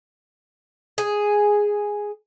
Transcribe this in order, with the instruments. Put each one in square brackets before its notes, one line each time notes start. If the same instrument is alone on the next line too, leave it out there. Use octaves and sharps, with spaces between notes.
[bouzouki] G#4